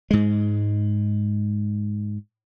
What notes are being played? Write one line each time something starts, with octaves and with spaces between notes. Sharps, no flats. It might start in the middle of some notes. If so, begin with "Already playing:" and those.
G#2 G#3